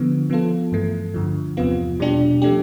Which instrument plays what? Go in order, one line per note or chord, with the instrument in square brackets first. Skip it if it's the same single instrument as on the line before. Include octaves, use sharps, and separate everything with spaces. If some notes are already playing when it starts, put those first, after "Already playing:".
Already playing: [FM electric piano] D3 F3 B3
F3 B3 F4 A4
G2 E3 A3
G2 D3 F3
E2 C3 F3 B3 F4
B2 G3 D4 G4
F3 A3 D4 G4